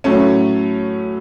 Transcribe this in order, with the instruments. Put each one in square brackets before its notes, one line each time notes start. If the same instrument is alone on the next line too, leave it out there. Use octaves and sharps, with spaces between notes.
[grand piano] A2 F#3 A3 C#4